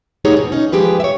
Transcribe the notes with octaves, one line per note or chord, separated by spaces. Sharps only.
A3 D#4 G4 G#4 C#5 F#5
E2 B2
C#4 D#4
D#2 F3 G#3 G4 G#4 B4
C#5 E5